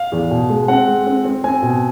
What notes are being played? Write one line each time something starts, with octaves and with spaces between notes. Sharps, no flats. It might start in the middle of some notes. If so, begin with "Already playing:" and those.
Already playing: F5
E2
B2
G#3
C4 F#5
G#3
C4
C4
C4 G#5
B2